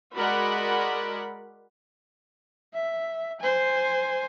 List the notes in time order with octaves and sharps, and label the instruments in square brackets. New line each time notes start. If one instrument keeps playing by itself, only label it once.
[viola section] G#3 F#4 A#4 D5 F#5 B5
[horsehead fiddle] E5
C5 G#5